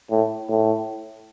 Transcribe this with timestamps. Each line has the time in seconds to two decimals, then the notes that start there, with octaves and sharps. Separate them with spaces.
0.11 A2
0.49 A2